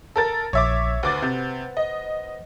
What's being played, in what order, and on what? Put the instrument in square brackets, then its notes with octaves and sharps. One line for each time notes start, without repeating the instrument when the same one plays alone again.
[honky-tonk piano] A4 A#4 A6
[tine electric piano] A#1 [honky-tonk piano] C#5 E5 D6
[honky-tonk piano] D2 D6 A6 [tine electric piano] B4 C5 F#5
[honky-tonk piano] C3
D#5